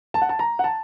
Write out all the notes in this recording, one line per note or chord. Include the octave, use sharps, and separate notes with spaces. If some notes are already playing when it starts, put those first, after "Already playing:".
A5
F#5
A5
A#5
F#5
A5